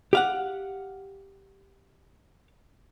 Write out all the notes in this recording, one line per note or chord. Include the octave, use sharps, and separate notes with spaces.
G4 F5 F#5